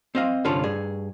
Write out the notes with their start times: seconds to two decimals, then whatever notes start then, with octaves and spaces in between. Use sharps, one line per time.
0.15 C4 D#5 F5
0.45 C2 G2 D3 C#4 F4 A5
0.64 G2 G#4